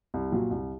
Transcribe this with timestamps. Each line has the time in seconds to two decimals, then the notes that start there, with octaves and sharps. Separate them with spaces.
0.14 C2
0.32 A#2 F#3
0.51 C2